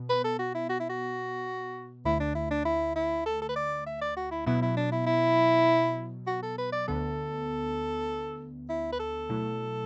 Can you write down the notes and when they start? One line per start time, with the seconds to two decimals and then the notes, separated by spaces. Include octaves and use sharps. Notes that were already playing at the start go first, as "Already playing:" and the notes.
Already playing: B2 B3
0.09 B4
0.24 A4
0.39 F#4
0.54 E4
0.69 F#4
0.80 E4
0.89 F#4
2.05 D2 D3 A3 E4
2.20 D4
2.35 E4
2.50 D4
2.65 E4
2.96 E4
3.26 A4
3.41 A4
3.49 B4
3.56 D5
3.86 E5
4.01 D5
4.16 F#4
4.31 E4
4.46 B2 F#3 B3 E4
4.62 E4
4.77 D4
4.92 E4
5.06 E4
6.27 F#4
6.43 A4
6.58 B4
6.72 D5
6.88 D2 D3 B3 A4
8.69 E4
8.92 B4
8.99 A4
9.29 B2 F#3 A3 E4